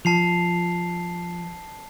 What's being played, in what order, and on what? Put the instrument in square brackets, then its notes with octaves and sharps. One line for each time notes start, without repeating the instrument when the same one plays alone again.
[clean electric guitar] F3 [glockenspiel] A5 C7 F7